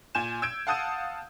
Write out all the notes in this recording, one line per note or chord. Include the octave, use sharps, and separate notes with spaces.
A#2 G#5 G6 E7
E6 G6 G#6 D7
F5 F#5 A5 D#6 G6 D#7